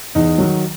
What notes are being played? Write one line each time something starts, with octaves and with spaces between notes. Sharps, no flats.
E2 D#4
D#3 F#3